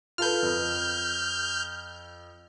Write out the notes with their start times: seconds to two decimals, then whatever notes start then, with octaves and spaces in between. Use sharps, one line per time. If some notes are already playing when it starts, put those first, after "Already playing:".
0.18 F4 A4 B4 F6 G6
0.42 F2